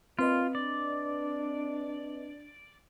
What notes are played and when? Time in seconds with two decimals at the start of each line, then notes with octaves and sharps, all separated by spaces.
0.19 A#2 C4 F4 B4 D#5
0.55 D4 D5